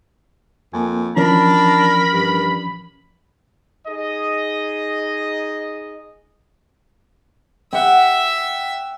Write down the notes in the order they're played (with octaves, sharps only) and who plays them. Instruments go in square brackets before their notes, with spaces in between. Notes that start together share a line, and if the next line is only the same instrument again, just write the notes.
[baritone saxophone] F2 [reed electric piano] A#3 G#5
[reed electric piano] E3 F3 C#4 [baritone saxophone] D4 [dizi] A#4 [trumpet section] B5
[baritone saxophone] G2
[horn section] D#4 G#4 D#5
[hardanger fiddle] E5 [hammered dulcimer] F#5 G5